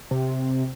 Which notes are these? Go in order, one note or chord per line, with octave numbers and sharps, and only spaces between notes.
C3